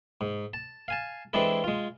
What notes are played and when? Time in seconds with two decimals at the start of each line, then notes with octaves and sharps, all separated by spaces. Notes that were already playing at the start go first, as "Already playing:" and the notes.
0.21 G#2
0.53 A5
0.88 F5 G#5 A5
1.33 E3 G#3 C4 D4 E4 A4
1.64 G#3 F4